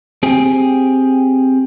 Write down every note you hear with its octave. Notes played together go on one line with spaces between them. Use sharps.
C4 G4 G#4